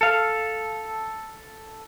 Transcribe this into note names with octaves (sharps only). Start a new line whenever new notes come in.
A4 F5